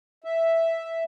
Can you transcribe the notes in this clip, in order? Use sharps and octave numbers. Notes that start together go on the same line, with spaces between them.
E5